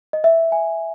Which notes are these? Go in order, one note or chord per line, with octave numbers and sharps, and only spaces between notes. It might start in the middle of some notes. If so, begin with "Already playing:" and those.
D#5
E5
G#5